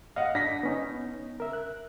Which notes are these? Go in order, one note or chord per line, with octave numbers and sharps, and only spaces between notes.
D#5 F5 F#5
D4 A#6 B6
B3 C#4 D#4
A#4 E5
F#6